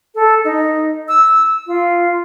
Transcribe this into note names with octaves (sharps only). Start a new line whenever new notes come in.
A4
D#4
E6
F4